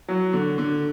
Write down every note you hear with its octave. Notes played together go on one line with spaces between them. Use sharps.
F#3
D3
D3